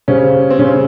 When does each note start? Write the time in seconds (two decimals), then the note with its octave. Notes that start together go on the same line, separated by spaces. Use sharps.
0.08 C#3 C#4 G4 C5 F5
0.50 C4
0.59 C#3 C#4